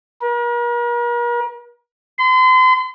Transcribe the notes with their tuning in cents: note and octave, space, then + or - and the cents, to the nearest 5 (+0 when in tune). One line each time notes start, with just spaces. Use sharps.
A#4 +40
C6 -40